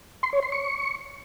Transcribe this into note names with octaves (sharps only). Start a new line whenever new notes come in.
C6
C#5
C6
C#6